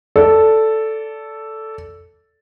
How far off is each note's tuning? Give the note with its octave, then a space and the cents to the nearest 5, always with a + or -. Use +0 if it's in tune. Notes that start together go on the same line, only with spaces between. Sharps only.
A4 +0 D5 -20